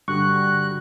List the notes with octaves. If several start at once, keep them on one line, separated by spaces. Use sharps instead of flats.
G2 D3 G3 F#4 C#6 F#6